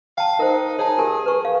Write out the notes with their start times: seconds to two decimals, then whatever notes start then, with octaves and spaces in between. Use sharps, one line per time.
0.18 F5 G5 A5
0.39 D#4 A#4 C5
0.79 G#4 C#5 A5
0.98 G4 A#4 G#5
1.26 B4 C#6
1.45 F5